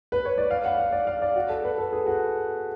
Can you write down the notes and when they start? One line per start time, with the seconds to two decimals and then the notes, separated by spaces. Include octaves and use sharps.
0.12 B4
0.25 C#5
0.38 D5
0.51 F5
0.65 F#5
0.78 F5
0.92 D5
1.07 F5
1.22 D5
1.36 F#4
1.49 A4
1.64 B4
1.78 A4
1.93 G#4
2.06 F#4